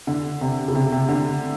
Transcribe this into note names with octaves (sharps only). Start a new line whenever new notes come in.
D3
C3
C#3
C3
C3
D3